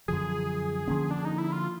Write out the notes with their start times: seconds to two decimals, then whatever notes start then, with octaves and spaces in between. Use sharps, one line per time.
0.08 F#2 D3 F3 G#4
0.88 D3 F3 A#3 C#4
1.11 D4
1.25 D#4
1.38 E4
1.52 F4